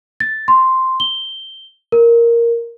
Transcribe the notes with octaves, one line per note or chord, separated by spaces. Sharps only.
A6
C6
G7
A#4